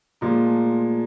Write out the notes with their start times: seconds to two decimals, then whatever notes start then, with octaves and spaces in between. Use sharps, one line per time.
0.21 A#2 F3 G#3 A#3
0.46 A3